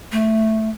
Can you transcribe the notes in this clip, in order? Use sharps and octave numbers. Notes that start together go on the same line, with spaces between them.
A3